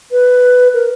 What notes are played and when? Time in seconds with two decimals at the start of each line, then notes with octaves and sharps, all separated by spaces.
0.11 B4
0.74 A#4